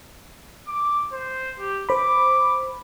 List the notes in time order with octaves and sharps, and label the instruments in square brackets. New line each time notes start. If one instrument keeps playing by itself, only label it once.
[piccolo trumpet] D6
C5
G4
[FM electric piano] C5 B5 [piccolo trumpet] D6